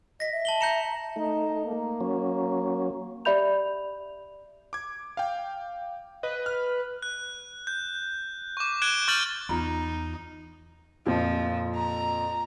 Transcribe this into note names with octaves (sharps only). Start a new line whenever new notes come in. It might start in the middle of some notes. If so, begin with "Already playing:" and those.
D#5 A#6 B6
E5
A5 F#7 G7
A#5 G6 C#7 E7
A3 D#4
A#3
F#3 C#4
G4 D5 E5 B5 G6 F7
D6 G#6
F5 G5
B4 D#5
F6
F#6
G6
C#6 D6
F#6 G#6 D7 E7 G7
C#6 F6 G6 A6 F#7
E2 D#4 F4 A#5 B5
F2 A#2 F3
A#5